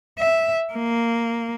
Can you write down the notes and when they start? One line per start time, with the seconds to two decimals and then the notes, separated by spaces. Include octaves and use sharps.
0.19 E5
0.74 A#3